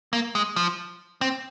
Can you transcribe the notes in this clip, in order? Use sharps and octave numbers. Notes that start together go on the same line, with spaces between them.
A#3
G#3
F3
C4